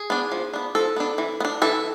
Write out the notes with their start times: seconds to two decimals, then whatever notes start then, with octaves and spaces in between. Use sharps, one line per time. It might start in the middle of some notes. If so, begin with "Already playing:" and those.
Already playing: G#4
0.10 B3 D4
0.32 F3
0.53 B3 D4
0.75 F3 A4
0.96 B3 D4
1.18 E3
1.40 B3
1.45 D4
1.62 E3 A4